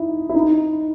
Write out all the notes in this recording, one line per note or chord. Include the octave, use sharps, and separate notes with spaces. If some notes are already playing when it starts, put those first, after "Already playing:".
Already playing: D#4 E4
E4
D#4